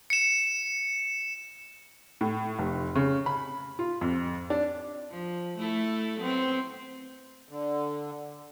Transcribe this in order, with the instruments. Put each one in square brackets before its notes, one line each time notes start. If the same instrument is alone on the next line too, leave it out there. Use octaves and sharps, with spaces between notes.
[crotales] C#7 E7
[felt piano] A2
F1
C#3
B5
F4
F2
D4
[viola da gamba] F3
A3 E4 A4
F#3 B3 C4
[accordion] D3